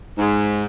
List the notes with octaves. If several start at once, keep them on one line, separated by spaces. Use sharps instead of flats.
G#2